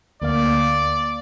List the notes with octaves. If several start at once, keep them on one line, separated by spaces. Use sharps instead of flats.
D2 A#3 D5 F5